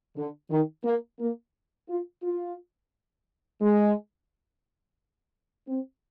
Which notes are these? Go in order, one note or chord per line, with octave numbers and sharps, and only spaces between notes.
D3
D#3
A#3
A#3
F4
F4
G#3
C4